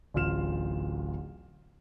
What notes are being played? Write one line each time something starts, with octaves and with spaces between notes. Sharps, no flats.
D1 A1 F4 F6 E7